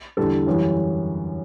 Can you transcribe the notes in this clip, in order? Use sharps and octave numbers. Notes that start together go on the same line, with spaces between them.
E2 D3 G3 A4
F#2 E3 G3